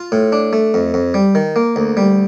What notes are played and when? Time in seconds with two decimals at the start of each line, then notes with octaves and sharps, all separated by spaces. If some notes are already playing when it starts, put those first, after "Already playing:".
Already playing: F4
0.12 A2
0.32 D4
0.53 A3
0.74 F2
0.94 F2
1.14 G3
1.35 D#3
1.56 A#3
1.76 D2
1.97 G3